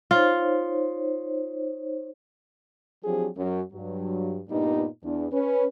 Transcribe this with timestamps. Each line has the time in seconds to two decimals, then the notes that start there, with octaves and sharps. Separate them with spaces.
0.11 D#4 F4 C5 C#5
3.04 F3 F#3 C4 D4 G4 G#4
3.36 F#2 F#3
3.72 G2 F#3
4.49 G2 A#2 G3 B3 D#4
5.03 E2 D4
5.32 C#4 B4